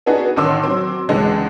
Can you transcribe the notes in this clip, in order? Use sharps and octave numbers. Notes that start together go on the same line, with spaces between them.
B3 D4 D#4 F#4 G#4 B4
A1 D3 D#3 C6 D6 E6
F#3 C4 C6
C#2 D3 E3 G#3